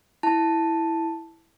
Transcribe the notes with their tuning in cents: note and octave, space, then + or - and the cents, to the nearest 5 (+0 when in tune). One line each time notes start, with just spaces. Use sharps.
E4 +0 A5 +0